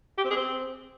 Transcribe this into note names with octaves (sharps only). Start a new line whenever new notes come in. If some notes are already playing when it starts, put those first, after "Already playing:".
G4
C4
G#4
C4